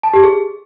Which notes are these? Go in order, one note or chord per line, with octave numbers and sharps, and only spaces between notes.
A5
G4
G#4